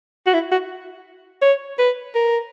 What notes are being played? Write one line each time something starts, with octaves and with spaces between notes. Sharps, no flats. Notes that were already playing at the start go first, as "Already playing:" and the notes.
F#4
E4
F#4
C#5
B4
A#4